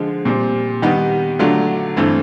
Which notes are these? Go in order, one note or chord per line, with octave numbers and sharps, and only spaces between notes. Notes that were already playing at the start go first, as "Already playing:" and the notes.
Already playing: D3 F3 G#3
A#2 G3 C4
D#3 G3 B3 D#4
D3 F#3 A3 D4 F4
G2 E3 A3 C4